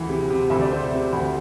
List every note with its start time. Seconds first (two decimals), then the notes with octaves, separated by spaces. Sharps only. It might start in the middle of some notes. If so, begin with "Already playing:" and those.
Already playing: D2 E3
0.09 C3
0.30 C3
0.50 D2 E5
0.61 D5
0.72 C3 C5
0.92 C3
1.13 D2